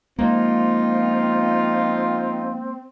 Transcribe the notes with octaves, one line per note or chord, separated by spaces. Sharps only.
F3 G#3 A#3 C4 D#4 F4